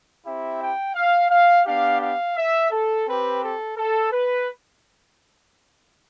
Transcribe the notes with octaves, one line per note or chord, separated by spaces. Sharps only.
C4 E4 G4 E5
G5
F5
F5
B3 D4 G4 F5
F5
E5
A4
C4 G4 B4
A4
A4
B4